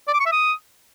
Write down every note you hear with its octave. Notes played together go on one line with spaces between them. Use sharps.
D5
D6
C#6
E5
D#6